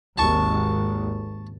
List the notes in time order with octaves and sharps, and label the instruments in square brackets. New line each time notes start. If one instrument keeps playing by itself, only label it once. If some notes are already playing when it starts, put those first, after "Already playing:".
[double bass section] G#1 D#2 [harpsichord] A5 C#6